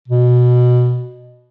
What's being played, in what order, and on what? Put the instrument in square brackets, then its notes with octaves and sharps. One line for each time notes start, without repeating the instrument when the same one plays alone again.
[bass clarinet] B2